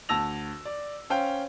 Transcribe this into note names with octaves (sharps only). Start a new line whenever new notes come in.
D2 A5 E6 A#6 F7
D5
C#4 C5 F5 G5